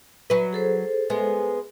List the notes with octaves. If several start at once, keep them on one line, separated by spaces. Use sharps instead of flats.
F#3 B4
G#4 A4 C5
G#3 B3